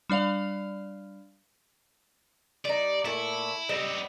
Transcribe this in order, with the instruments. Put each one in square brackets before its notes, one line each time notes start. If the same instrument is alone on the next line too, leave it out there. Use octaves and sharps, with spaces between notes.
[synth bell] G3 D4 D5 F5 F7
[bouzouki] G3 D#4 [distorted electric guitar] D5
[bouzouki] A#2 A3 [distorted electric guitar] E4
[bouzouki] G3 D#5 [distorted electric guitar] B3 C4